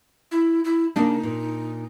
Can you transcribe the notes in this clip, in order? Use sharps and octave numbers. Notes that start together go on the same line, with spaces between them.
E4
E4
C#3 A#3 D4 D#4
A#2